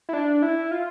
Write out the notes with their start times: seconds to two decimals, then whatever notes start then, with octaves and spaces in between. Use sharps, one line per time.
0.09 E4
0.13 D4
0.42 E4
0.71 F4